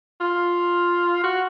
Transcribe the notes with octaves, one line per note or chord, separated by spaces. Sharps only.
F4
F#4